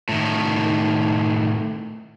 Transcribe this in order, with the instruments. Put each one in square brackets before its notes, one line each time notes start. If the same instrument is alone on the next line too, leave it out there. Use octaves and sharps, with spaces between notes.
[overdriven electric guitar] A2 D#3